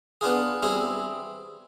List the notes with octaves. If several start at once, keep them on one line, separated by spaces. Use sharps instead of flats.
B3 D4 F4 G#4
G3 C4 E4 G#4